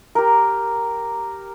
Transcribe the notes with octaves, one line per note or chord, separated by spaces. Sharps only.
G4 A#4